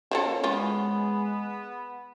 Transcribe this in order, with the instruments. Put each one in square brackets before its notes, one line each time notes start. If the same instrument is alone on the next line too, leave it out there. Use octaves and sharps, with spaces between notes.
[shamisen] F3 A#3 A4 [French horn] C#4
[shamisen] E3 C#4 F4 [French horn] G#3 [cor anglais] B3